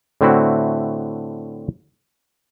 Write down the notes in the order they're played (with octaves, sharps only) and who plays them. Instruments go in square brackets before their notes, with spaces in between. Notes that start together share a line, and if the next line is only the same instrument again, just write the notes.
[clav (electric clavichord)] A2 D3 A3 C4 E4 F#4